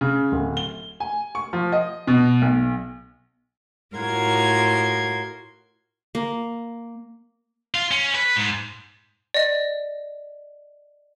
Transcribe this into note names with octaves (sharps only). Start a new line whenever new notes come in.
C#3
D1
G7
G#5
C#6
F3
D#5
B2
B1
A2 F4 F#4 A#4 C6 G#6
A#3
F4
C#4
B4
G#2
D5 D#5